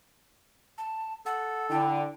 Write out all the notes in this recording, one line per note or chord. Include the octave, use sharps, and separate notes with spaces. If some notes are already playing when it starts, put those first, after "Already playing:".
A5
A4 F#5
D3 E4 G5